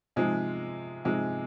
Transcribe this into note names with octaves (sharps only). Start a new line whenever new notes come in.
C3 F3 G#3 D#4 G#4
C3 F3 G#3 D#4 G#4